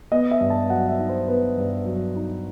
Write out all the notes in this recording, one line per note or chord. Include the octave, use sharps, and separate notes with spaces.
B3 D#5
E5
G2
A5
F#3 F#5
E5
D#4
C5
B3 B4
G2
F#3
D#4